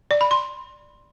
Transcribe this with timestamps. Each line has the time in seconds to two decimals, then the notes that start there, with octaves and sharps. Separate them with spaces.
0.11 D5
0.21 B5
0.31 C6